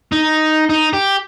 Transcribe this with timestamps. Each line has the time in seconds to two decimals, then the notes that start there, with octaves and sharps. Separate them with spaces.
0.12 D#4
0.70 D#4
0.93 G4